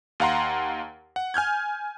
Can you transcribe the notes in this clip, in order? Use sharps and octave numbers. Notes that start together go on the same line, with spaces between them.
D#2 F5 F#5 A#5 C6
F#5
G#5 F6 G6 G#6